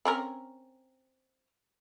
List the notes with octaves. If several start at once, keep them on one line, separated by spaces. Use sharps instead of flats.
C4 C#4 A#4